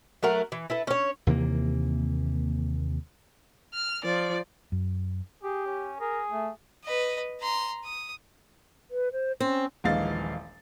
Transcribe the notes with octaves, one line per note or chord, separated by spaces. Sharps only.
F#3 A3 A#4 F#5
E3
E4 A4 B4
C#4 C#5
D#2 C3 E3 A#3
F6
F3 D5
F#2
G4 G#4
C#4
G#4 A#4
A3
B4 D#5
A#5 C6
D#6
B4
C5
C4 C#4
D#1 A#1 E3 G#3 F5 A6